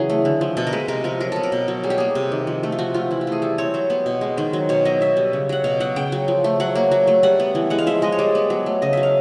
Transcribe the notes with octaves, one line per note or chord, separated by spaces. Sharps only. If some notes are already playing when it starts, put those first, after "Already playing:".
Already playing: C#3 E3 F#3 G#4
A3
D3
F3
B2 A4
A#4
G#3 B4
C3 A#4
F3 A#4
F#3 A#4
B3 A4
A#4
B2
F#3
G3 G#4
G4
A#3 G#4
C3
D#3
F3
A3
F4
F3 F#4
A3 F4
E3 E4
G4
A3 G#4
G3 A4
C4 C#5
F#3 C5
B3
B2
G#3
D#3 C5
F#3
B2 C#5
F#3 D#5
B2 E5
G3
C#3
F#3 F#5
B2 F5
F#3 F#5
C#3 G5
F#3
F3
A3
F#3 F#5
A#3
F#3
A3
G3 F#5
B3
E3
G#3 F#5
F5
F3 E5
G#3 D#5
C#5
G3 D5
B3
F#3
A3
C#3 D#5
F#3 E5
F5